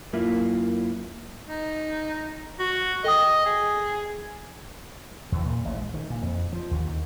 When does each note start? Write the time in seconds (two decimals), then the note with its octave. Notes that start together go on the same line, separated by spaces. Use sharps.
0.13 F#2 A#3 E4 F4
1.47 D#4
2.60 F#4
3.04 A4 D#5 G5 D#6
3.45 G#4
5.32 E2
5.46 A#2
5.65 A1
5.76 G#3
5.94 D#3
6.10 A#2
6.22 F2
6.53 F3
6.71 D#2
6.86 D#3